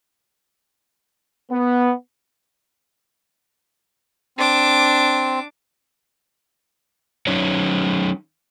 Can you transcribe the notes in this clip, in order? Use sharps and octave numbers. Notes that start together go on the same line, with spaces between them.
B3
C4 D4 D6
F#3 C#4 D#4 C#5